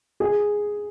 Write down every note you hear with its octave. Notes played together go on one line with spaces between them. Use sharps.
G#4